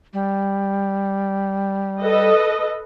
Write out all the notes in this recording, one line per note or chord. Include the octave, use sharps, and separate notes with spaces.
G3
A4 B4 D#5